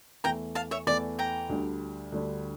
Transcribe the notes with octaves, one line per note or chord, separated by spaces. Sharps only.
E2 E3 A3 G5 A#5
F5 A5
C#5 E5
E2 E3 A3 D5
G5 A#5
D2 D3 G3 D4
D2 D3 G3 D4